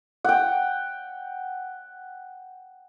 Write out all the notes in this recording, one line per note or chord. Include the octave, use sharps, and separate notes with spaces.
F#5 G5